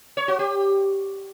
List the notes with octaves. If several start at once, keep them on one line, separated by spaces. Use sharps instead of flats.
C#5
F#4
G4